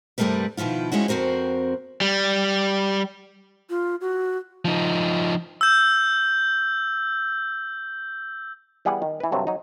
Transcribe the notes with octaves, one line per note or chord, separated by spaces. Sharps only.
G2 C3 G3 A3 A#4 B4
B2 D#3 F3 E4 F4
F3 G#3 C#4 E4 F#4
F2 C4 F#4 A#4 C5
G3
F4
F#4
F3 D#4
E6 G6
E3 G3 B3 G#4 B4 F#5
D#3
E3 B4
G2 C3 F#3 A4
F#3 D#4